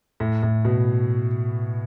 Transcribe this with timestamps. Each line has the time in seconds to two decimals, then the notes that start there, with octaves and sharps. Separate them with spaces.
0.20 A2
0.43 A2
0.65 B2